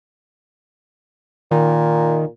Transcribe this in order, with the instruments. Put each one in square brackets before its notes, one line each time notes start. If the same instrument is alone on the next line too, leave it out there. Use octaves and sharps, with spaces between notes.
[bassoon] A#2 [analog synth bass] D#3